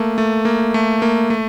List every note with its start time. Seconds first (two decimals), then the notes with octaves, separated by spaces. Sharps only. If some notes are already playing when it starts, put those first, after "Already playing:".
Already playing: A3 A#3
0.18 A3
0.45 A#3
0.74 A3
1.02 A#3
1.30 A3